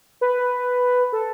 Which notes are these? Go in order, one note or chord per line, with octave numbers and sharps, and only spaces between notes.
B4
A4